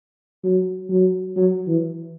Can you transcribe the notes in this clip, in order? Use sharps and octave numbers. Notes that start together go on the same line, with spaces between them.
F#3
F#3
F#3
E3